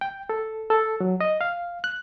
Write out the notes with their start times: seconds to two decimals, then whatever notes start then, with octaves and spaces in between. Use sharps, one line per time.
0.01 G5
0.29 A4
0.70 A4
1.00 F#3
1.21 D#5
1.41 F5
1.84 F#6